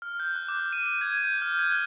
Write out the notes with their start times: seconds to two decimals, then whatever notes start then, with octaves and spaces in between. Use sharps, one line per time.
0.02 F6
0.20 G6
0.36 F#6
0.48 D6
0.73 D#7
0.86 D#7
1.01 G#6
1.24 G6
1.42 F6
1.59 G#6
1.72 F#6